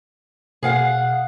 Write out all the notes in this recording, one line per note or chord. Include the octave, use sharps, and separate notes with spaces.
B2 G#4 F5 F#5